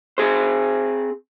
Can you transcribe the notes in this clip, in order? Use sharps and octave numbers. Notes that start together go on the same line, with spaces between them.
C4 G#4 C5